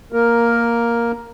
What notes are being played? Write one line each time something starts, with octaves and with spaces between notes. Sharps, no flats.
A#3 A#4